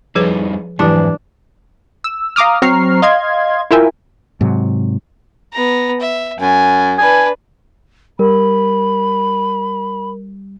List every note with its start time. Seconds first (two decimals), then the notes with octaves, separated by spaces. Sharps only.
0.15 F2 F3 G3 D#4 G#4 B4
0.79 F2 G#2 E3 F#3 D4 E4 G4
2.04 E6
2.36 F5 A#5 D6 D#6 F6
2.62 F#3 C4 A#5 C#6 F6 C7
3.02 D#5 F5 C6 G#6
3.71 E4 F4 A#4 E5 G5 G#5
4.41 G#2 C3 F#3
5.52 B3 A#5
6.00 E5
6.39 F#2 G#5
6.99 D4 B4 G#5
8.19 G3 A#4 B5